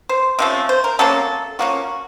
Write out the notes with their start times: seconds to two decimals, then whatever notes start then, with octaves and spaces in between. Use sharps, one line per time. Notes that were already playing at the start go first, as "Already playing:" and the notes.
0.09 C5
0.39 C3 F3 A3 C#4
0.69 C5
0.84 A#4
0.99 C3 F#3 A#3 C#4 A4
1.59 F3 A#3 C#4 F#4